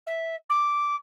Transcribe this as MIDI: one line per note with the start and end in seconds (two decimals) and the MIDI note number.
0.06 0.35 76
0.49 0.96 86